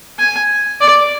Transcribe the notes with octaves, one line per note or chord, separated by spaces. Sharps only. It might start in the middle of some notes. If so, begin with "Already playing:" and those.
G#5
D5